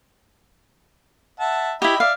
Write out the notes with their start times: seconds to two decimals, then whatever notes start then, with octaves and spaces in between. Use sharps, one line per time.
1.40 E5 F#5 A5
1.82 E4 G4 D#5 E5 B5
2.00 D5 E5 F5